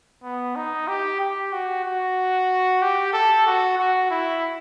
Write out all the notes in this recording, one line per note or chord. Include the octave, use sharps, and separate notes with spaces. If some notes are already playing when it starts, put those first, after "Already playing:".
B3
D#4
G4
G4
F#4
F#4
G4
A4
F#4
F#4
E4